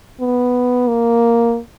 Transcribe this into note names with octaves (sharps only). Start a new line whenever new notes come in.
B3
A#3